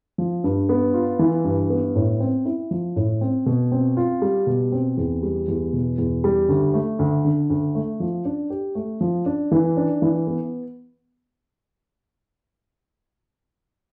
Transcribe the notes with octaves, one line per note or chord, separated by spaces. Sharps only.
F3
G2
B3
F4
E3
G2
B3
A2
C4
E4
F3
A2
C4
B2
C4
F4
G3
B2
C4
E2
G3
E2
B2
E2
G3
D2
A3
D2
D3
D2
A3
F3
D4
G4
A3
F3
D4
E3
D4
E3
B3